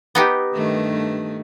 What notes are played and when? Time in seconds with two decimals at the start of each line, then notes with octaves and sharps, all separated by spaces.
0.15 B3 D#4 G4
0.54 G2 D#3 A3